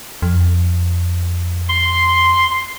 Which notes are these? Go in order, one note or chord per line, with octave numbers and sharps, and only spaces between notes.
F2
C6